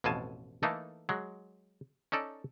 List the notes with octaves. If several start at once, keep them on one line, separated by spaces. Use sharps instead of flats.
A1 F2 B2 F5 G#5 A5
E3 A3 A#3 D#4 A4
F#3 G#3
C#4 D#4 A4 D5